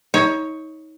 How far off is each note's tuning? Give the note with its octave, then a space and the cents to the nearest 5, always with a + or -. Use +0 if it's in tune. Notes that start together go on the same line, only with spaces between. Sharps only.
D#4 +30 C#5 +0